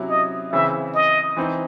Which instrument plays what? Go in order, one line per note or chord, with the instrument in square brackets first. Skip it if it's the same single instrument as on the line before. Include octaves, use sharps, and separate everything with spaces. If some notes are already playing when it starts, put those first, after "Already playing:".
Already playing: [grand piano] C3 F#3 C#4 E4
[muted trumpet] D#5
[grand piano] C#3 E3 C4 [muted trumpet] E5
[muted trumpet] D#5
[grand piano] E3 C4 D#4